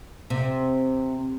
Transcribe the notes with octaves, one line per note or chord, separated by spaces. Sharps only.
C3